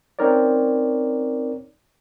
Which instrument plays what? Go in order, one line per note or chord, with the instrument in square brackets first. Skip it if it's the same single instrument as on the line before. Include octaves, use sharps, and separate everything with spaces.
[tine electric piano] C4 C#4 D#4 A#4 C#5 D5